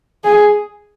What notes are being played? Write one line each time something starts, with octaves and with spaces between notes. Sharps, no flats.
G#4